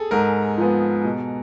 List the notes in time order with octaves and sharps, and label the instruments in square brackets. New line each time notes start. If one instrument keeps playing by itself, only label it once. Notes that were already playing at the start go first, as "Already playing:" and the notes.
Already playing: [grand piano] G#4 A4
[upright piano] G#2 [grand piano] A#4
[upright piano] F3 G#3 B3
B2